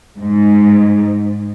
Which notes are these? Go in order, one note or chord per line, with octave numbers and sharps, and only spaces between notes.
G#2